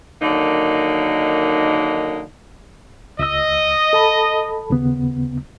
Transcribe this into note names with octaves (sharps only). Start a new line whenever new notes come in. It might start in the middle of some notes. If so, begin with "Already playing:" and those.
D3 D#3 F#3 A#3 D#4
C#2 D#5 E6
A4 A5 B5
D#2 C#3 B3